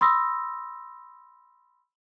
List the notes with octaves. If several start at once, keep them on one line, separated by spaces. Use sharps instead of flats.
B5 C6 D#6 E6 A#6